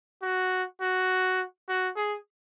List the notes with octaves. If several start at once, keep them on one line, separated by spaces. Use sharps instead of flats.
F#4
F#4
F#4
G#4